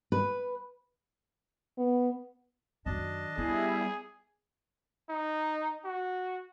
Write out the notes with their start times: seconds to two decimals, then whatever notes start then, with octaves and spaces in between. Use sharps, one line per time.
0.12 B4
1.78 B3
2.86 F#2 D#3 D4 D#5 A5
3.38 G3 B3 E4 G#4
5.10 D#4
5.85 F#4